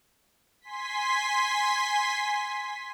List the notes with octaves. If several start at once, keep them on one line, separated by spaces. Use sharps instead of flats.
G#5 C6 B6